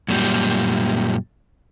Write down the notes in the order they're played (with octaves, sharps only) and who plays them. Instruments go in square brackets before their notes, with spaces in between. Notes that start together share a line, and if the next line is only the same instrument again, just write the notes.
[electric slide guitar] F#2 A#2 G3